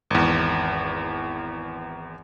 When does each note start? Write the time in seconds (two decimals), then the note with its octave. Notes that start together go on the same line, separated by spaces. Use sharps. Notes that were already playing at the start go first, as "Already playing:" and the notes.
0.10 G#1 E2